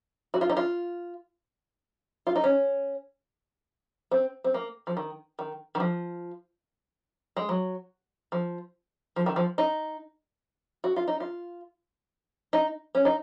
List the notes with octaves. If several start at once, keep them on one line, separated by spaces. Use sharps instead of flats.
F#4
F4
D#4
F4
F4
D#4
C#4
C4
C4
A#3
F3
D#3
D#3
D#3
F3
G#3
F#3
F3
F3
D#3
F3
D#4
F#4
F4
D#4
F4
D#4
C#4
D#4